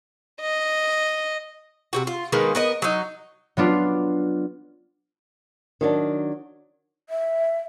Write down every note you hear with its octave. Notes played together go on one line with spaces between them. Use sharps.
D#5
C3 D#3 F#4
F4
D#3 G#3 A#3 B3
B3 A#4 D#5
F#3 D#4
F#3 B3 D4 F4
D#3 F#3 D4
E5